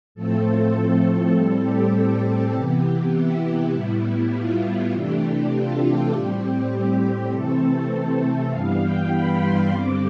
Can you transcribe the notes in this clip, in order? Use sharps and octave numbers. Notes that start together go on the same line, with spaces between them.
A2 F3 A3 C4 A4
A2 G3 C4 A4
G4
C3 E3 B3
E4
A2 G3 B3
F4
C3 E3 A3 D4 G4
F4
A4
A2 G3 C4 G4
C3 E3 A3 C4 A4
G2 E3 G3 B3 F5
G5
B5
C6
G2 D3 G3 C4 D6